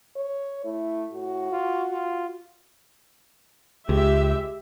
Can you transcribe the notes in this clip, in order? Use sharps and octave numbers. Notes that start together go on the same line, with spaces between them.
C#5
A3 E4
A2 F#4
F4
F4
C#2 G#3 G4 E5